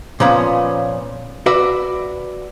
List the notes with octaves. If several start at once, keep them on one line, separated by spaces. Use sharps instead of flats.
A#2 F3 B3 C#4
F#4 B4 D5 E5